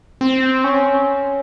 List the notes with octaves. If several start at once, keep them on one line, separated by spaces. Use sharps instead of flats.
C4
C#4